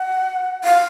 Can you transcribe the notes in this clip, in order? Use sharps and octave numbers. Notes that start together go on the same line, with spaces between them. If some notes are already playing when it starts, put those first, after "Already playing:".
Already playing: F#5
F5